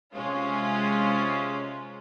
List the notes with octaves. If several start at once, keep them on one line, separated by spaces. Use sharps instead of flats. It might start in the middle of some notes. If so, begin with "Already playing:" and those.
C3 G#3 C#4 F4